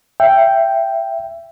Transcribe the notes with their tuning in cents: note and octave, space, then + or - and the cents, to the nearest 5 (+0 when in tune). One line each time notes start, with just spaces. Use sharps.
E5 +20 G5 +0